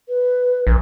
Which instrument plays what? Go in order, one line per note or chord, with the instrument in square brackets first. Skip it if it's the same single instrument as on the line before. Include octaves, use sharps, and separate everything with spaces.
[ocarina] B4
[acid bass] A#1